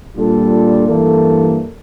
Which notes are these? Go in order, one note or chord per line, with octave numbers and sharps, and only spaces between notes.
A#2 G3 D4 F4 A4
G2 E3 A#3 E4 A4